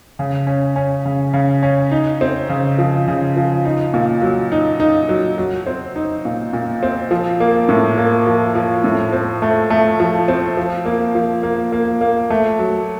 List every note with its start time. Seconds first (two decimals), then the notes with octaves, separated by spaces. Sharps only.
0.19 C#3
0.47 C#4
0.76 C#4
1.05 C#3
1.33 C#3
1.63 C#4
1.91 D#4
2.21 C4
2.49 C#3
2.78 F3
3.08 C#3
3.36 F3
3.65 D#4
3.94 A#2
4.22 F#3
4.52 D#4
4.80 D#4
5.09 F#3
5.38 F#3
5.66 C4
5.96 D#4
6.25 A#2
6.53 A#2
6.83 C4
7.11 F3
7.40 A#3
7.69 A2
7.98 A#3
8.27 F3
8.55 F3
8.84 A2
9.12 C4
9.42 A3
9.70 A3
10.00 F3
10.28 C4
10.57 F3
10.85 A#3
11.15 F3
11.43 A#3
11.72 A#3
12.01 A#3
12.30 A3
12.59 F#3